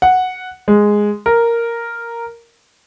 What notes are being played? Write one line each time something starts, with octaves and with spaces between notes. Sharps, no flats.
F#5
G#3
A#4